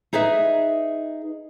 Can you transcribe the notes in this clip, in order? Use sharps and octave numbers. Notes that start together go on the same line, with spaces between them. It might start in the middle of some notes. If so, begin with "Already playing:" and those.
D#4 G#4 B4 D#5 E5